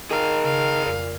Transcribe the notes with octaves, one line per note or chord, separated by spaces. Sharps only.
D#3 G#4 A#4 F5
C#3 F5
F2 A#2